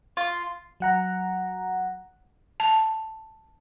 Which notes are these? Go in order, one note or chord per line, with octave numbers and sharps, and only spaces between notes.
F4
F#3 F#5 A#5
A5